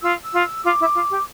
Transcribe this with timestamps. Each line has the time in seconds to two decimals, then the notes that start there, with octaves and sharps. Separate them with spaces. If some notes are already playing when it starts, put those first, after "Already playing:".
0.02 F4 E6
0.24 E6
0.33 F4
0.64 F4 D6
0.80 E4
0.95 F4
1.11 G4